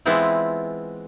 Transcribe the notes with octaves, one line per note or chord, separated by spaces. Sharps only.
E3 G#3 B3 C4 E4 F4